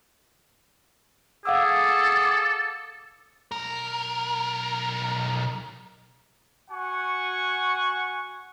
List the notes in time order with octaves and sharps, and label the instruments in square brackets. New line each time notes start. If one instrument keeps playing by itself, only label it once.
[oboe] G#4 [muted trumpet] A4 [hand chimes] F5 F#5 E6 [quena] D6
[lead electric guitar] B1 A#4
[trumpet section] F#4 F#5 G#5 C#6